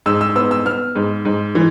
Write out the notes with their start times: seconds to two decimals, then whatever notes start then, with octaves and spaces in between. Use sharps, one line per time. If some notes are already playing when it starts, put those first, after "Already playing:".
0.06 G#2 E6
0.21 E6
0.36 B3 E6
0.51 E6
0.65 B3 F6
0.95 G#2
1.25 G#2
1.55 E3